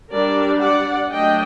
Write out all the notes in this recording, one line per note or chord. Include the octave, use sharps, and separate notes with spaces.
G3 D4 A#4 D5
D5 F#5
F#3 A3 D4 D#5 G5